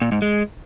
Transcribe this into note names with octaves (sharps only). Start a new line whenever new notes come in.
A#2
G#2
G#3